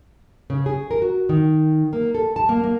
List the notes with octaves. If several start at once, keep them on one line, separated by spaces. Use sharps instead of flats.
C#3
G#4
A#4
F#4
D#3
A#3
A4
A5
A#3
A#3